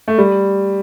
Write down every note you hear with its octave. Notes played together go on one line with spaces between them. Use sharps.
A3
G3